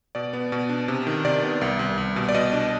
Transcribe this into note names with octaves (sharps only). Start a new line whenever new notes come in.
B2 D5
B3
B2
D4
C3
D#3
C3 D5
B3
C2
C2
C2
B2
D5
B2 D#5
D4